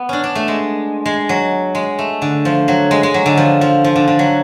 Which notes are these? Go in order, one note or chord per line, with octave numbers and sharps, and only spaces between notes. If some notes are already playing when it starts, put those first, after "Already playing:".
Already playing: B3
C#4 D4
D4
A3
G#3
G#3
F#3
G#3
A3
D3
F3
F#3
G#3
G#3
F#3
D3
F3
F3
F3
D3
D3
F#3